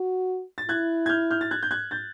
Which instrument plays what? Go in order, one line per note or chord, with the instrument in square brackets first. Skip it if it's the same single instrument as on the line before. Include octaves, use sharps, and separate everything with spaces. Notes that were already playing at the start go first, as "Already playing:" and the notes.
Already playing: [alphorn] F#4
[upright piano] A6
[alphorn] E4 [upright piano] F#6 G#6
[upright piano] G#6
F6 G6
F6 G6
A6
F#6 G#6
G6
F#6 G#6
G6 A6